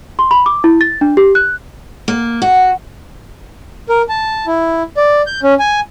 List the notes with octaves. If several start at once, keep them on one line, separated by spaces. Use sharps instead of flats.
C6
B5
D6
E4
A6
D4
G4
F#6
A#3
F#4
A#4
A5
E4
D5
G6
C#4
G#5